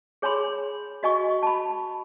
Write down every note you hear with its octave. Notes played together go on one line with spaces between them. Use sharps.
G#4 C#5 G#5 B5 C6
F#4 D#5 G#5 C#6
A5 B5